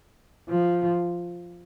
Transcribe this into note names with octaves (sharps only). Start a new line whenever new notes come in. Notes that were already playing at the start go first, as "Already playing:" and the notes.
F3